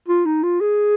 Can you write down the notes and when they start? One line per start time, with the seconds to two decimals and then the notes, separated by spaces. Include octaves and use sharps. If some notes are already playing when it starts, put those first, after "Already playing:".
0.08 F4
0.26 D#4
0.43 F4
0.61 G#4